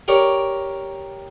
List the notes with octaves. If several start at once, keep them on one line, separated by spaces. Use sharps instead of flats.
G4 A#4 C#5 D5 A#5